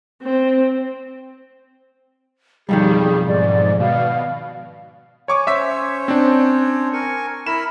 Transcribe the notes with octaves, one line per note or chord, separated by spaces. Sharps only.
C4
B1 F2 D#3 G3 G#4
G#2 D5
B2 F5
C#5 G#5 C#6 D6
C#4 C5 C#5 E5 E6 B6
C4 D4
A#4 G#5 C#6
E4 A#4 B5 E7